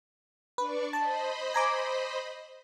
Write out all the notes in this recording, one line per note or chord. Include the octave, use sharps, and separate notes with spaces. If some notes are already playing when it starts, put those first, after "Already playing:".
D4 B4 D5 C#6
C5 D#5 A5 B5
G#5 A#5 D6